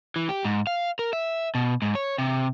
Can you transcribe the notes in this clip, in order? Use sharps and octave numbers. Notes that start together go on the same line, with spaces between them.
E3
G4
G#2
F5
A#4
E5
B2
G#2
C#5
C3